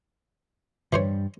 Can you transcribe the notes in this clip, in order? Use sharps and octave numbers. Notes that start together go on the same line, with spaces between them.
G2 E3 G3 C5 C#5